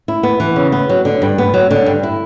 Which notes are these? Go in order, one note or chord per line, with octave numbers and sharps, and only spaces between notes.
E4
B3
E3
C#3
B3
F#3
D3
G2
B3
F#3
D3
G2
E4